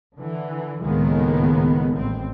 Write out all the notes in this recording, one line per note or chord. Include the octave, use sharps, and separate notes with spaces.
D3 E3
C#2 A2 D#3 G#3 A#3 B3
A1 C4